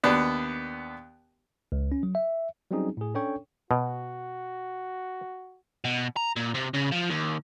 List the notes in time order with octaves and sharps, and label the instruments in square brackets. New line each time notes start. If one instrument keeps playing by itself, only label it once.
[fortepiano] D#2 B3 D4
[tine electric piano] C#2
C#4
F#3
E5
F#3 G3 C4 C#4 D#4 G#4
A2 G#4
C#4 D4 A4 C#5 G5 C#6
[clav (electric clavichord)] B2 [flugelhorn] F#4
[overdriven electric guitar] B2
A#5
A#2
C3
C#3
F3
D#2